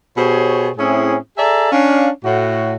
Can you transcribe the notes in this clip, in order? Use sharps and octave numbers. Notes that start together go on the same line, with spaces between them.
B2 G4 G#4 C5 C#5
A2 C4 C#4 E4 G#4
G#4 A4 D5 E5 A5 A#5
C#4 D4 F5
A2 F#4